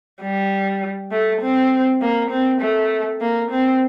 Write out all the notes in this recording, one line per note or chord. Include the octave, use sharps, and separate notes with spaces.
G3
A3
C4
A#3
C4
A3
A#3
C4